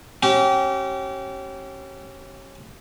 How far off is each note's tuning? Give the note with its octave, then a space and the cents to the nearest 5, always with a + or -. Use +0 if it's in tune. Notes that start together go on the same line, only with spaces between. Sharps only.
C#4 -25 G4 -35